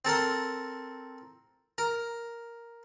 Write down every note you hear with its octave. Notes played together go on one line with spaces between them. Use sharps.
C4 A4 A#4 C6
A#4